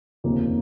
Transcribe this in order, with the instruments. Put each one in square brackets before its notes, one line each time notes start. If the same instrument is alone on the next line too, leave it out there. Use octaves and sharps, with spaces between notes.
[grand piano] F1 D#2 C#3 F3 A#3